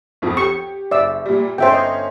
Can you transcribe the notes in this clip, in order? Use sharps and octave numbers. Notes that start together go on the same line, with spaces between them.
B1 F2 F3
G4 C#6
F#1 D5 E5 E6
A#2 G3
G1 C#4 C5 E5 G5
D#5